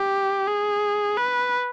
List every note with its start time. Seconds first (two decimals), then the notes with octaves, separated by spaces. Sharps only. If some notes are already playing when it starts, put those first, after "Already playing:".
Already playing: G4
0.47 G#4
1.18 B4